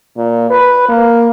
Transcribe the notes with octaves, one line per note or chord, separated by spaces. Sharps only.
A#2
B4
A#3